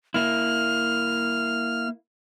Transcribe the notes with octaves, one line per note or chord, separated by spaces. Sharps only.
A#3 E4 F6